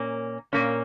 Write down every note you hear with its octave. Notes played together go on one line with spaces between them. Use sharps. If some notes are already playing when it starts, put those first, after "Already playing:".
Already playing: A#2 A#3 C#4
A#2 A#3 C#4